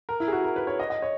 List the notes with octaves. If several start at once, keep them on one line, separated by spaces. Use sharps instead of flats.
A#4
E4
G#4
F#4
A#4
B4
C#5
D#5
D#5
C#5